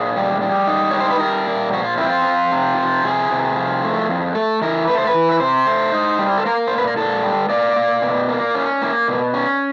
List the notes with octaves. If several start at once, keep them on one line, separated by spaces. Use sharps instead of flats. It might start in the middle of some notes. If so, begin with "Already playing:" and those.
Already playing: A#2 G#4
G3
G3
D#4
G3 C#5
C5
B4
G3 A#4
A#2
F3 F#4
F4
C4 E4
F4
F3
C3
F3
C3 G#4
C3
F3
A3
F2
A3 A4
E3 A#4
A3 B4
C5
B4
E3
B4
C3 C5
A3
D#4
G3
A4
A#3 A#4
A#2 C5
B4
A#4
A#2 A4
G3
A#3 D5
A#3
B2
A#3
C#4
A#3
B2
C#4